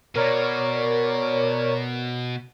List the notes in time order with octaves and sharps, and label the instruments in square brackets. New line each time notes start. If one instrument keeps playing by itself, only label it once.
[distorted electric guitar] B2 [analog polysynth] A#4 C#5 D5